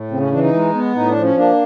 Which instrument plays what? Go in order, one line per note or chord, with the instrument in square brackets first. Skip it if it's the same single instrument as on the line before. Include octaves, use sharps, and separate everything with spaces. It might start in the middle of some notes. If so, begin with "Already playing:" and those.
Already playing: [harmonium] A2
C#3 C4
C#4
E3 D4
D#4
G#3
B3
A2 D#4
D4
F3
C#4
A#3 D4